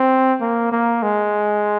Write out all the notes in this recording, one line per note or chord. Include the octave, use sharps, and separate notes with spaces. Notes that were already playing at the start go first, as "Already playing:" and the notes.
Already playing: C4
A#3
A#3
G#3